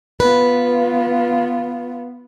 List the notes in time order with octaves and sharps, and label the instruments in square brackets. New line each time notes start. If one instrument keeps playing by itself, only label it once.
[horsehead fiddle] B3 F4 [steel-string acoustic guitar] B4